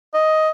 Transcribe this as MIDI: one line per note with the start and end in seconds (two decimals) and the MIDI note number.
0.14 0.50 75